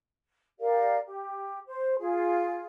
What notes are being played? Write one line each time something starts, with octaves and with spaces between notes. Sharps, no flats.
G4 A#4 D5 F5
G4
C5
F4 G#4